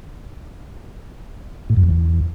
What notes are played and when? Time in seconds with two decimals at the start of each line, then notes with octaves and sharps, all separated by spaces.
1.70 A2
1.77 F#2
1.83 F2
1.90 E2